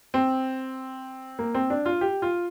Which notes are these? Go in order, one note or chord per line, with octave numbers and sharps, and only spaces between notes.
C4
A#3
C4
D4
F4
G4
F4